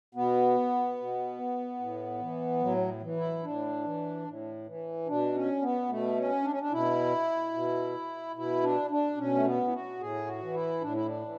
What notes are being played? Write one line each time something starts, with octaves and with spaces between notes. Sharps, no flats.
B2 B3
B2
A2
E3
A2 F#3
E3
E4
A2 D4
E3
A2
E3
B2 D4
C#4
B3
B2 A3
C#4
D4
C#4
D4
B2 E4
B2
B2 E4
D4
D4
B2 C#4
A3
B3
E4
F#4
A2 G#4
F#4
E3
E4
A2 D4
E4
D4
E3